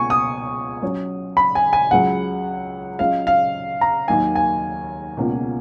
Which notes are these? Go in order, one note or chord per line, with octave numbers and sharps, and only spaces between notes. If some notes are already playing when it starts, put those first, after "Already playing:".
Already playing: C#2 B2 A#3 G#5 C#6
D#6
F#3 C#4 F#4 C#5
B5
G#5
G#5
C#2 C#3 F#3 F#5
F#3 C#4 F4 G#4 D#5 F5
F5
A#5
D#2 D#3 F#3 A#3 D#4 G#5
G#5
C#2 B2 A#3 C#4 F4